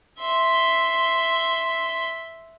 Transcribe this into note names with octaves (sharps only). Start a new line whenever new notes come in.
E5 C6